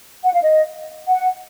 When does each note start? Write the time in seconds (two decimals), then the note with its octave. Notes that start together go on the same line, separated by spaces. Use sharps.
0.24 F#5
0.32 F5
0.42 D#5
1.07 F#5